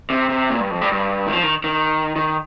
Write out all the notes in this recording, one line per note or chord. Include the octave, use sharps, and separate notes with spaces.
C3
C3
A#2
G2
F2
G2
G2
D#3
F3
D#3
D#3
D#3